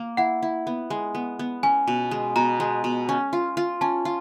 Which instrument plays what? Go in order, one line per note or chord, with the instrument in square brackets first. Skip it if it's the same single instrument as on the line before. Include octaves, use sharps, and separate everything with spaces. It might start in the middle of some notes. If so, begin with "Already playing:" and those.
Already playing: [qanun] A#3
[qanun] E4 [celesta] F#5
[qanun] E4
B3
G#3
B3
B3
[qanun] C#4 [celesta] G#5
[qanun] B2
G#3
[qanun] B2 [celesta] A#5
[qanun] G#3
B2
C#4
F4
F4
[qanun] C#4 [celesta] A5
[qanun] F4